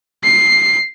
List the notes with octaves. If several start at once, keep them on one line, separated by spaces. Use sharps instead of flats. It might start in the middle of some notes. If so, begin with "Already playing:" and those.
C7